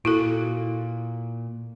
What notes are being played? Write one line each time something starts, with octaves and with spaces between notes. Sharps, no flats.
A#2 E4 F#4 A4